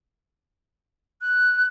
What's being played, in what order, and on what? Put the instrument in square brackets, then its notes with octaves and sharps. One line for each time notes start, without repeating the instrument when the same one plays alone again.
[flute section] F#6